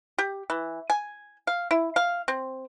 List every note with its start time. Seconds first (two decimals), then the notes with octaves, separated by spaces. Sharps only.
0.18 G4
0.50 E3
0.90 G#5
1.47 F5
1.71 E4
1.96 F5
2.28 C4